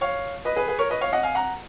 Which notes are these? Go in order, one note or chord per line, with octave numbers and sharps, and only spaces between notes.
C#5 F5
B4 D#5
G#4 B4
G#4 B4
A#4 C#5
B4 D#5
C#5 F5
D#5 F#5
F5 G#5
F#5 A#5